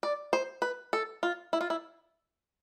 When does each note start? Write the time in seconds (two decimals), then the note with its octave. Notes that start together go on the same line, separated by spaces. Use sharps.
0.03 D5
0.33 C5
0.62 B4
0.93 A4
1.23 F4
1.53 E4
1.61 F4
1.70 E4